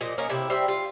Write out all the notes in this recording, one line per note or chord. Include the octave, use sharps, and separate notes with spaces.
A#2 F3 D#5
A#3 C#4 A#4 D#5
C3 E4
G3 C4 E5
F4